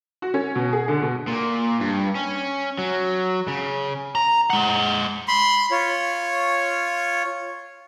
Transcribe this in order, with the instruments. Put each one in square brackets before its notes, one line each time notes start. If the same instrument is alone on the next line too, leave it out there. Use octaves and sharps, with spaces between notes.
[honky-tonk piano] F#4
C#4
B2
G#4
D3
B2
[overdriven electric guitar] A#2
G2
C#4
F#3
C#3
A#5
G#3 F#5
[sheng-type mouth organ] B5 C6
F4 C#5